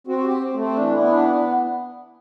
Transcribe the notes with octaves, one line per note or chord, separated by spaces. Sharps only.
C4 F#4
F#4
G4
C4
C4
A3
C4
E3 D4
E4
B3
D4